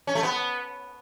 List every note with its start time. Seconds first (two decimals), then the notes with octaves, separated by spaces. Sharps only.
0.07 C#4
0.15 A3
0.23 B3